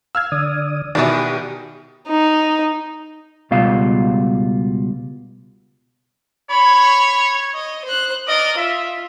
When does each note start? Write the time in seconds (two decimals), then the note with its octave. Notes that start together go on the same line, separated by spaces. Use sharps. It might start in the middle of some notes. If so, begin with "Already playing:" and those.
0.15 F5 E6 F6 G#6
0.32 D3 D5 D#6
0.95 B2 D#3 E3 B3 D4 G4
2.08 D#4
3.51 C#2 B2 G3 F4 F5
6.50 C#5 B5
7.54 D#5
7.85 C5 F#6
8.28 A#4 D5 D#5
8.57 F4 E5